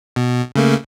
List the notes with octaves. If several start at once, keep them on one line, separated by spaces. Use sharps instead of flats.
B2
C#3 A3 A#3